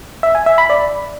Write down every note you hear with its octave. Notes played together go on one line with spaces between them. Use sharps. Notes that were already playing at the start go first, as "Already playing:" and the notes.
E5
G#5
E5
B5
D5